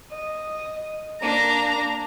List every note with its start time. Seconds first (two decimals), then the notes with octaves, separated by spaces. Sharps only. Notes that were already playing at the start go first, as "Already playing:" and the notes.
0.11 D#5
1.22 A#3 D4 A#5